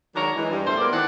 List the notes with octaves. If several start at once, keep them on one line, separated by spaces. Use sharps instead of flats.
D#3 F#3 G#3 D4 A#4 C#5
E3 G#3
G2
E2 A#2 A3 C5
G#3 B3 A#4 D5
D#3 E3 C4 D4 D5 F#5